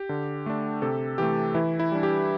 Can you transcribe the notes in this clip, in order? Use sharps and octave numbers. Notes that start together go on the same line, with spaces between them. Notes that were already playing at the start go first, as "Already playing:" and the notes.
Already playing: G4
D3
A3 D4
C3 A4
E3 A3 G4
E3 E4
E4
G3 D4
G4